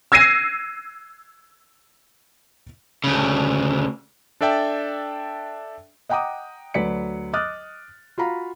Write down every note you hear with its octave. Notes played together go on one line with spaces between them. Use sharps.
E6 G#6 A#6 C7 D#7
D2 C#3
D4 A4 D5 E5 G5 A5
D#5 F#5 G5 A#5 D6 D#6
D2 F#3 B4 D5 B6 C#7
D#5 D6 D#6 F6 F#6 A6
F4 F#4 F5 A#5 B5